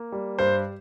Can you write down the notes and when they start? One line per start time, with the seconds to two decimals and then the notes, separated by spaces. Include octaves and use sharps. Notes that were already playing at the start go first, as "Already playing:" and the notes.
Already playing: A#3
0.12 G3
0.39 G2 C5